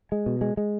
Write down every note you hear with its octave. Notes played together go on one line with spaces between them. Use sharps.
G#3
B2
G#3
G#3